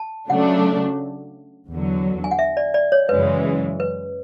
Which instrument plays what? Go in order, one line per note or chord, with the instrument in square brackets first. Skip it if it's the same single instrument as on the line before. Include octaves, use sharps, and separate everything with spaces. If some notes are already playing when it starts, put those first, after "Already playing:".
Already playing: [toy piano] A5
[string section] C#3 F#3 A3 D4 [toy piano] F#5
[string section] E2 D3 F#3
[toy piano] G#5
F#5
E5
D5
D5
C#5
[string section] F#2 C#3 E3 G#3 [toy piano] B4
[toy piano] B4